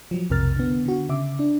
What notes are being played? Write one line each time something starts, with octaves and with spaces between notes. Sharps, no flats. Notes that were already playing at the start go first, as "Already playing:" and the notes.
F3 F#3
B1 F2 C3 A#4 F6 A6
D3 B3
D3 F#4
C#3 E5 D6
D4